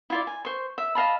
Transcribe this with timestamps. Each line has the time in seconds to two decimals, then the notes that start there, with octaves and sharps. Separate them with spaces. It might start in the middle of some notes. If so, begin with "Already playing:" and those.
0.10 E4 F4 D5
0.27 G#5
0.45 C5 C#6
0.78 E5
0.95 D#5 F5 A5 B5